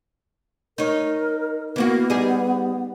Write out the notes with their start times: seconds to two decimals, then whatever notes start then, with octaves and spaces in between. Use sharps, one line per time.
0.78 D#4 A#4 C#5
1.76 E3 A#3 B3 F#4
2.10 G3 D#4 G#4